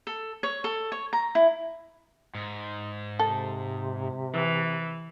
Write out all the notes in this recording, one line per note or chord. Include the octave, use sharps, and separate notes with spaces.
A4
C#5
A4
C#5
A#5
E4
G#2
C3 A4
E3